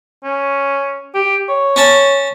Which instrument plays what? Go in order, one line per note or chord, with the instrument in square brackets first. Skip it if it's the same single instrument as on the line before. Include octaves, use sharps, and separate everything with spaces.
[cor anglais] C#4
G4
C#5
[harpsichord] C#4 A5